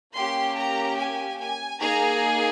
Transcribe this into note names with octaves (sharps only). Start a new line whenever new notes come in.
A#3 C#4 G4 C6
A#5
G#5
G#5
A#3 D#4 G#4 A#5